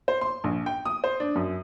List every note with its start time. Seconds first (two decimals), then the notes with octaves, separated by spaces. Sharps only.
0.08 C5
0.21 C6
0.44 A#1
0.66 G5
0.85 D#6
1.04 C5
1.20 D4
1.35 F#2